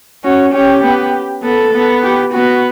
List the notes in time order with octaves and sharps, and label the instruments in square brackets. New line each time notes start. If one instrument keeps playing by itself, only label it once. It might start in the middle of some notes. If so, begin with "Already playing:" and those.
[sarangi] C#4 [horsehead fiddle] F#4
[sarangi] C#4 [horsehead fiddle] G4
[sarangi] B3
[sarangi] B3 [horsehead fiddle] A4
[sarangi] B3
[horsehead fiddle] G4
[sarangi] B3 [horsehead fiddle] F#4